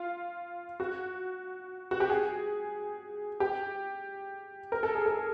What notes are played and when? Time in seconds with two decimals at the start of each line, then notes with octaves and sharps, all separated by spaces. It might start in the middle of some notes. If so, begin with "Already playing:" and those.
Already playing: F4
0.80 F#4
1.91 F#4
2.00 G4
2.10 G#4
3.40 G4
4.72 A#4
4.83 A4
4.95 G#4
5.06 A4